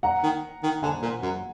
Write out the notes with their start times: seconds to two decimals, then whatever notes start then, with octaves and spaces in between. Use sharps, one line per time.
0.03 F#5 A#5
0.23 D#3
0.63 D#3
0.83 D3 G#5
1.02 A#2
1.22 F#2